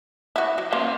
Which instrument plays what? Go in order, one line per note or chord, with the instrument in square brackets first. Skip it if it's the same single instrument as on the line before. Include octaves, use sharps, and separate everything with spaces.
[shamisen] E4 F#4
F#3
[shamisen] A#3 [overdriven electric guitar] E5 C6